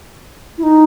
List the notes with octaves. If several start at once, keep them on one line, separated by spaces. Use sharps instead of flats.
E4
D#4